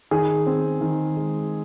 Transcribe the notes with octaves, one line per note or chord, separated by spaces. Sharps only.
D#3 G#4
C4
D#3
G#3